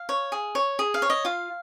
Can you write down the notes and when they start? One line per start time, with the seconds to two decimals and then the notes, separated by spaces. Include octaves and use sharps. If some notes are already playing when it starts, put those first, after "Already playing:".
Already playing: F5
0.09 C#5
0.32 G#4
0.55 C#5
0.79 G#4
0.94 F5
1.02 C#5
1.10 D#5
1.25 F4 F5